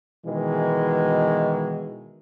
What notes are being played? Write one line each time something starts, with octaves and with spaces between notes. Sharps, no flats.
B2 D#3 E3 G#3